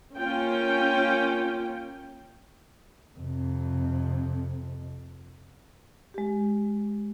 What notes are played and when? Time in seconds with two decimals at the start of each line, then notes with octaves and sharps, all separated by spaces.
0.17 A#3 C#4 F4 G5
3.18 F2 C3
6.14 G#3 G4